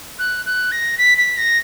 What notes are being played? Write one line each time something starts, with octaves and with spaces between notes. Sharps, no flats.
F#6
F#6
A#6
B6
B6
A#6